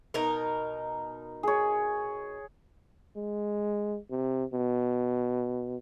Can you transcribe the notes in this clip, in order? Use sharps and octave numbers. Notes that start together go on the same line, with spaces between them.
B2 D#4 A#4
G#4 C#5
G#3
C3
B2